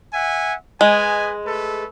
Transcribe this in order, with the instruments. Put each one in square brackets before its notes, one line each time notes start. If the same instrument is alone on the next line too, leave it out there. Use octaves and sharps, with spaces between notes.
[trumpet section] E5 F#5 G#5
[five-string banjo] G#3 [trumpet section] B4 D#5 G#5
[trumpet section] A3 A4 B4